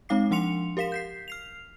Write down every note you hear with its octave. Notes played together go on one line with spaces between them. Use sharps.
G#3 C4 D#4 F5 D6 C7
F3 D4 F#5 C6 C#7 F7
G4 A#4 F5 B6 E7
G6 B6 C7
F6 C7 F7